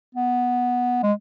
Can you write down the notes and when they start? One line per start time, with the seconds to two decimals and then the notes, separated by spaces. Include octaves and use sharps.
0.15 B3
1.03 G#3